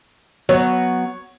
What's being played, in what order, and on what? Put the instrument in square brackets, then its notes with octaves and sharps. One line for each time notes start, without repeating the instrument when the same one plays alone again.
[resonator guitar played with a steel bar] F#3 B3 [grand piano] C#5